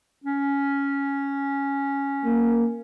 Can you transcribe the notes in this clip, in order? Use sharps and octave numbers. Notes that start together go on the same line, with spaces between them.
C#4
A#3